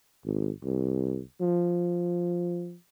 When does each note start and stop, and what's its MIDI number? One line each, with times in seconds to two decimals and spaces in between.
0.25 0.50 32
0.64 1.21 36
1.41 2.76 53